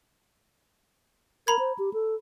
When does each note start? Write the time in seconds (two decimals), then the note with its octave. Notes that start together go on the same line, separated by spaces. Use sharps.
1.47 A#4 A#5 B5 G#6
1.59 C5
1.79 G4
1.93 A4